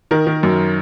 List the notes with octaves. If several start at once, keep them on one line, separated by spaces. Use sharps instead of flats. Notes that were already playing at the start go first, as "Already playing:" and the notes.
D#3 A#4
D#3
F#2